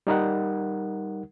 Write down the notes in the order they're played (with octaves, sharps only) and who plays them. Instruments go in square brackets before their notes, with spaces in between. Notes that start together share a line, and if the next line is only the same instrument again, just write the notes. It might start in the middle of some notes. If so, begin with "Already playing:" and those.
[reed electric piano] G3 D#4 A#4 F#5